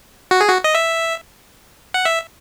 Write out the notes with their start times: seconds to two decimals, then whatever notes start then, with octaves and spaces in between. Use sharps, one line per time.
0.31 F#4
0.41 G#4
0.49 F#4
0.64 D#5
0.75 E5
1.94 F#5
2.05 E5